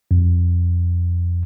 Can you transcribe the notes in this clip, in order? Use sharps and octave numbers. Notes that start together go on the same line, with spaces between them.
F2